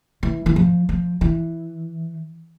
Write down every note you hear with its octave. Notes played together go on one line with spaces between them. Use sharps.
E3
E3
F3
F3
E3